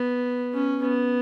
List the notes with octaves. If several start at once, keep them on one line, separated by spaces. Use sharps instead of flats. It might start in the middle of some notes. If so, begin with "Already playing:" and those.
Already playing: B3
C#4
B3